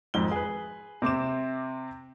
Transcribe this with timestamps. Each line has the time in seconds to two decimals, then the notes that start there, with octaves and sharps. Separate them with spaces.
0.14 G#1 F2 G#2 G7
0.32 G#4 B4
1.02 C3 C4 D6 E7